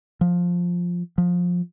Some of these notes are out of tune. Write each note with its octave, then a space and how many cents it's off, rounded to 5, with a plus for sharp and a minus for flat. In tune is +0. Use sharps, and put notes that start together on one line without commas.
F3 +10
F3 +20